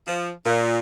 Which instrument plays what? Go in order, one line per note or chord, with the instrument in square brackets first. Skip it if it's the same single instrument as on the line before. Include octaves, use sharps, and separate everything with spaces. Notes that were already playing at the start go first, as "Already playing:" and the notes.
[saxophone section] F3
A#2